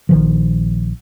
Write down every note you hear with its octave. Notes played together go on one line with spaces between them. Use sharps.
A#1 D#3 F3